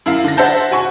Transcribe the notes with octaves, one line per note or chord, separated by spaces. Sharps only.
F#2 E4 F5
D3 A#6
C5 E5 F#5 A5 G6
F#4 G#5 C#6